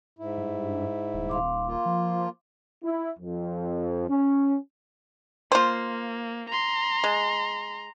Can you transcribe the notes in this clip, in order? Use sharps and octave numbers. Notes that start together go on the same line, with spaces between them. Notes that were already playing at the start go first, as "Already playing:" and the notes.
G#2 E4
G2
D#1
F5 C6 D6
A#3 F4
F3
E4
F2
C#4
A#3 F4 C5
A#5 C6
G#3